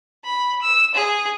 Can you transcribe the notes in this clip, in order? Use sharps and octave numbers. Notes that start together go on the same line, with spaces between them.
B5
E6
G#4